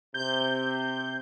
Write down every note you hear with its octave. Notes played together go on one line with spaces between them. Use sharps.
C3 G6